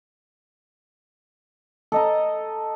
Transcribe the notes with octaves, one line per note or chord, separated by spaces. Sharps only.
A4 D#5 A#5